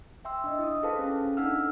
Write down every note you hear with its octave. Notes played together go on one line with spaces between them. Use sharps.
E5 G5 C6 E6
D4 D#5
E4 D#6
G#4 A4 B4 C5 F5 A5
C#4
D4 D#4 A4 F#5 E6 F6